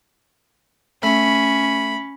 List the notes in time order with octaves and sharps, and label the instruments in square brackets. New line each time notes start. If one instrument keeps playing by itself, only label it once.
[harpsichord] A3 [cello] C#4 [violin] B5